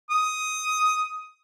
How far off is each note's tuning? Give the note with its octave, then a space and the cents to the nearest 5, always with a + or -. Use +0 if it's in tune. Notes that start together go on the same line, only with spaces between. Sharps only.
D#6 +10